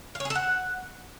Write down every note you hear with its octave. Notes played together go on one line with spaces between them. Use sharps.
F5
C#5
G#4
A4
F#5